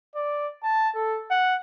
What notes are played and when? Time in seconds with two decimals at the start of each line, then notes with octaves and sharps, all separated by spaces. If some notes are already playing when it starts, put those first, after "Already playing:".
0.16 D5
0.63 A5
0.95 A4
1.31 F#5